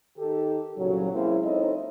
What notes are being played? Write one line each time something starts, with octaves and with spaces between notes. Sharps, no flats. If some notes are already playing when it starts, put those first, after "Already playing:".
D#3 D#4 G4 A4
C2 A#2 C#3 F#3
G#3 A#3 C4 C#4 E4
C4 D#4 E4 A4 C#5 D#5